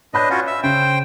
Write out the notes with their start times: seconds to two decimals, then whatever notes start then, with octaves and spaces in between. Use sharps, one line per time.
0.14 D4 B4 C#5 D#5 B5 G6
0.30 C#4 F4 F#4
0.47 E5
0.63 C#3 C5 G5